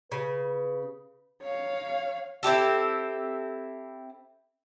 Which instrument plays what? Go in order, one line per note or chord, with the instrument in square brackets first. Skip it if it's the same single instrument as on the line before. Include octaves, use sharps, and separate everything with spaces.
[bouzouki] C#3 [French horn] B4
[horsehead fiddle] C#5 F5
[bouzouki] C4 E4 G4 A4